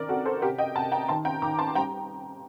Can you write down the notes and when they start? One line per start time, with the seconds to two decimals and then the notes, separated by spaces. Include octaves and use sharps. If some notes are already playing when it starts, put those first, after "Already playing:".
Already playing: D#3 A#4 D5
0.09 C4 F#4 A4
0.25 A4 C5
0.42 C3 G4 A#4
0.59 D#5 G5
0.75 C3 F#5 A5
0.92 G5 A#5
1.08 D#3 A5 C6
1.25 G5 A#5
1.42 D#3 A#5 D6
1.59 A5 C6
1.75 G3 G5 A#5